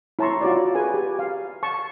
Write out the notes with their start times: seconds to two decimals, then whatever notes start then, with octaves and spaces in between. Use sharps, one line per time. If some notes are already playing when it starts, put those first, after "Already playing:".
0.19 E4 C#5 A5 A#5 C6 C#6
0.41 F4 F#4 C#5 D5
0.75 G#4 B4 G#5
0.94 G4
1.19 F5
1.63 A5 C#6